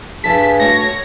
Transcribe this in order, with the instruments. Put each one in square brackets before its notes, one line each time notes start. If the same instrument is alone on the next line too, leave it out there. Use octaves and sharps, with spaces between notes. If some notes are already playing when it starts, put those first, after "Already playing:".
[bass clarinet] G2 [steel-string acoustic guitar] G#4 E5 G#5 [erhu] A5 [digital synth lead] B6
[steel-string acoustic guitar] A3 F#4 A5 [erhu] C#5 [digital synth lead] A#6